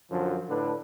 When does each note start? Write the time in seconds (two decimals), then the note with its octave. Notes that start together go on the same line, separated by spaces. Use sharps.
0.10 F#2 D3 F3
0.47 A2 D3 D4 B4